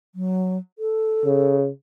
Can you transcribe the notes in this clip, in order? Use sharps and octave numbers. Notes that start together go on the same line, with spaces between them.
F#3
A4
C#3